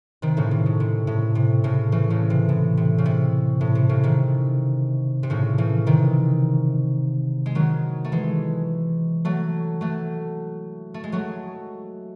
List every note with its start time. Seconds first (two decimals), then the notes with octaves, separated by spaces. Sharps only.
0.22 C3 D#3
0.37 A2 C#3
0.51 C3
0.66 A2
0.80 C3
1.07 A2
1.35 C3
1.64 A2 C#3
1.92 C#3 E3
2.10 A2 C#3
2.30 C3
2.49 A2
2.77 C3
2.98 C#3
3.06 C3
3.61 A2
3.75 C3
3.89 A2 C#3
4.03 C3 D#3
5.23 C3
5.30 A2 C#3
5.58 C#3 E3
5.87 C3 D#3
7.46 G#3
7.55 D#3 F#3
8.05 A3
8.12 E3 G#3
9.25 F#3 A3
9.81 F#3 A3
10.94 A3
11.04 G#3
11.12 F#3 A3